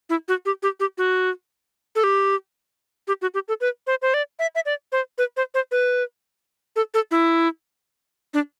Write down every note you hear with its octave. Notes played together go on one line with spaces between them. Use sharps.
E4
F#4
G4
G4
G4
F#4
A4
G4
G4
F#4
G4
A4
B4
C5
C5
D5
E5
E5
D5
C5
B4
C5
C5
B4
A4
A4
E4
D4